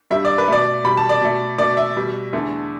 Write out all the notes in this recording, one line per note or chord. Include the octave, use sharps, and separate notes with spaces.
G2 G3 E5
D5
B4
B2 A3 D5
B2 G3 B5
A5
D5
B2 A3
B2 A3 D5
E5
B2 G3
E2 D3 A3